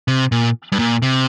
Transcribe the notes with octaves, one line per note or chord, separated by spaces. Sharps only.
C3
A#2
G2
A#2
C3